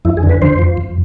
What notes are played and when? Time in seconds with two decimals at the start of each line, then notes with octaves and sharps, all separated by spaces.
0.05 F2 E4
0.17 G#4
0.23 D3
0.29 B4
0.42 F2 C5
0.59 F3
0.77 F2